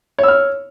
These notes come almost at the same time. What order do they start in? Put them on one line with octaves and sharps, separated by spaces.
C#5 E6 F6